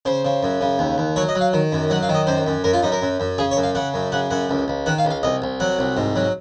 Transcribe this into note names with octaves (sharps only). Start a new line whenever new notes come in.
C#3 C5
C#3
F#2
C#3
D#2
D#2
F#3 C#5
D#5
F#3
F5
D#3
F#2
F#3 F#5
F5
D#3
D#5
F#2 C5
F#2
F#2 A#4
F4
F#2 D#4
A#4
F#2
F#2
C#3 G#4
C#5
F#2
F5
C#3 F#5
F#2
C#3 F#5
F#2 F#5
C#2
C#2
D#3 F#5
F5
C#2
F5
C2 D#5
C2
F#3 F#5
C2
G#2
F#3